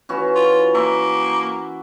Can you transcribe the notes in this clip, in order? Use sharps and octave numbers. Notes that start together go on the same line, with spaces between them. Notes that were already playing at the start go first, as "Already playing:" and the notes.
E3 C#4 F#4
F4
A#3 E5